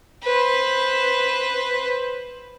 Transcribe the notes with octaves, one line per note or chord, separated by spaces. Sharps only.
B4 C5